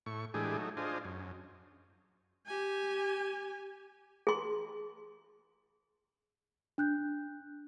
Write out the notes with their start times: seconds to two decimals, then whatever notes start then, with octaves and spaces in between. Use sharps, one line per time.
0.06 A2 C#6
0.34 A2 E3 G#3 D4 G4 G#4
0.57 F#3 A3 D#4
0.77 D4 F4 G#4 C5 D#5
1.05 F#2
2.46 G4 G#5
4.27 G#4 C6
6.78 D4 F#6 G6